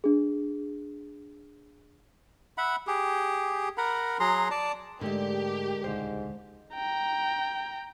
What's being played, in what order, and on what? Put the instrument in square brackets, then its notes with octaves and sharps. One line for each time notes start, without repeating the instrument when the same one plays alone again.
[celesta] D4 G#4
[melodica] E5 F#5 B5
G4 G#4
A#4 F#5 A#5 B5
F#3 G#4 A#5 C6
D5 A5
[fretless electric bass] G#2 A3 [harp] D3 G#3 [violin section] G4 [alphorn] A#4
[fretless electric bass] D#1 C#2 [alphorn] G#2 [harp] C5
[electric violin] G5 A#5